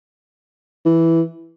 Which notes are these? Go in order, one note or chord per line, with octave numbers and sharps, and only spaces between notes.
E3